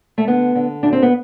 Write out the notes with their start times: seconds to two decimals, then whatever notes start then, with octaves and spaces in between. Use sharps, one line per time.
0.18 A3
0.28 D3 B3
0.55 D3
0.83 D2 D4
0.93 C4
1.02 B3